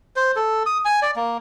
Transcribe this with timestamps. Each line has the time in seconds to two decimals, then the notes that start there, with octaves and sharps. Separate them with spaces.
0.16 C5
0.36 A4
0.66 D#6
0.85 G#5
1.02 D5
1.16 A#3